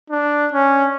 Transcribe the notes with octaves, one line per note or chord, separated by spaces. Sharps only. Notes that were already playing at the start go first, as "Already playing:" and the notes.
D4
C#4